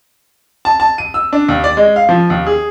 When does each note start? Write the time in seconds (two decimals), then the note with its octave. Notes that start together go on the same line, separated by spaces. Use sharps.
0.65 A5
0.80 A5
0.98 D#7
1.14 E6
1.33 D4
1.49 D#2
1.64 D5
1.77 G#3
1.96 F5
2.09 F3
2.30 D#2
2.47 G#4